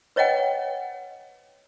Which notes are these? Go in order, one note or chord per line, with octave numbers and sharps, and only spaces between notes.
B4 C#5 D#5 F#5 G5